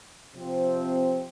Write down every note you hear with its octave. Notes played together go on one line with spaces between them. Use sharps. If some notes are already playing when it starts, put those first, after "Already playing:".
C3 F3 C4